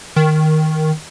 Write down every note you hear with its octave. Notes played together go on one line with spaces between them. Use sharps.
D#3